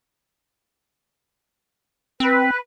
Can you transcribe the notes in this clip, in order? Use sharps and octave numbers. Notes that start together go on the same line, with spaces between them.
C4 B4